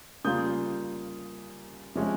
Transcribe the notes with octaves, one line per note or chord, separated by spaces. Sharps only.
C#3 G3 A#3 F4 D#6 G6
C3 F3 G#3 C#4